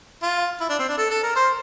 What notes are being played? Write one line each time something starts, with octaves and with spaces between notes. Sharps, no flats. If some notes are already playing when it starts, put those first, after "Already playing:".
F4
E4
D4
C4
D4
A4
A4
A#4
C5